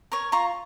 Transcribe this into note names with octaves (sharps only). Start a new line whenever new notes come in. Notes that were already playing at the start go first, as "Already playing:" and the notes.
A#4 C#5
F4 A#5 C#6